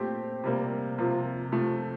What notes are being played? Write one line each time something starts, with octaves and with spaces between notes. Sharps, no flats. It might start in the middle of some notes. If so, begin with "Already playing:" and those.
Already playing: A#2 A3 C4 G4 C5
C3 G3 A#3
C3 F3 A#3 F4
C3 F3 A3